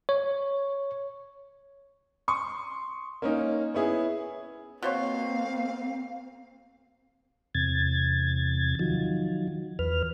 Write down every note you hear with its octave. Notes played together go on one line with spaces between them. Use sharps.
C#5
C6 C#6 D#6
A#3 C#4 D#4
B3 C#4 E4 G#4
B2 A#3 C4 C5 C#5 F5
E2 C3 G#6 A6
D#3 F3 F#3
E2 B4 F6